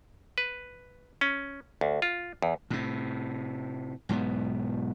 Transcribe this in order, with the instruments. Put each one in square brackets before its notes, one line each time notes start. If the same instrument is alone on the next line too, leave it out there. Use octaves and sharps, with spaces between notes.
[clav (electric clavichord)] B4
C#4
D2
F4
E2
[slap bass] A2 C3
B1 G#2 B2 B3